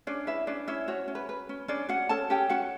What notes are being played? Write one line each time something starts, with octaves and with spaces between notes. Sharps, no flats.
C#4 D4 D5
E4 B4 E5
C#4 D4 D5
C#4 E4 E5
F#4 C#5
C#4
B4
B4
C#4
C#4 D4 D5
C#4 F#4 F#5
C#4 A4 A5
C#4 G4 G5
C#4 F#4 F#5